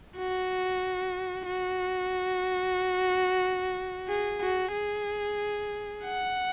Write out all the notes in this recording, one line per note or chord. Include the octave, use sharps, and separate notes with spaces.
F#4
F#4
G#4
F#4
G#4
F#5